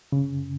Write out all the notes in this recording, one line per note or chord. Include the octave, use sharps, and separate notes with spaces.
C#3